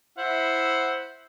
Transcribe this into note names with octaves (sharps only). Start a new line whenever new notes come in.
E4 C5 E5 F#5